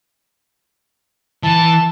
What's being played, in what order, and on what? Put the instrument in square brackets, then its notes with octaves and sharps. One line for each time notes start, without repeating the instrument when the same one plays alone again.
[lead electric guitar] E3 [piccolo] A5